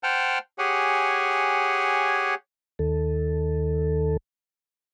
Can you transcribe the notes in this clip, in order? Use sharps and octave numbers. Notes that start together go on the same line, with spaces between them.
C5 F#5 G5 A5 F6
G4 G#4 C#5 F#5 G#5
D#2 D#3 A4